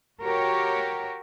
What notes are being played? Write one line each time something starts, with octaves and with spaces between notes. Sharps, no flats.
F#4 G4 A#4 C#5